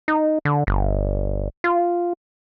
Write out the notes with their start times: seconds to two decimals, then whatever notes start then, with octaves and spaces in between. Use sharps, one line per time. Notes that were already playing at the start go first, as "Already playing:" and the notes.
0.08 D#4
0.45 D3
0.67 G1
1.64 F4